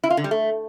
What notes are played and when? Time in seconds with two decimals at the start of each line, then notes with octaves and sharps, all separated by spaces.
0.04 E4
0.10 F4
0.17 D3
0.24 G3
0.31 A3